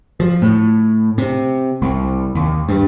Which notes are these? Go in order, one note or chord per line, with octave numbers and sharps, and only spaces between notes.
F3
A2
C3
C2
D#2
G2